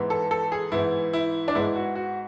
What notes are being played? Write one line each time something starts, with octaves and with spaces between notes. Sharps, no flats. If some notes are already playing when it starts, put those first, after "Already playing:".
Already playing: G#2 E3 B3
A4
A4
G#4
G#2 E3 B3 E4
E4
D4
G#2 G#3 B3 E4
F#4
F#4